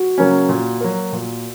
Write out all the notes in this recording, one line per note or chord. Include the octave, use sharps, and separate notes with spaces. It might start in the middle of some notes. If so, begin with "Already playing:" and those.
Already playing: F#4
C#3 F#3 A#3 C#4
A#2
F#3 A#3
A#2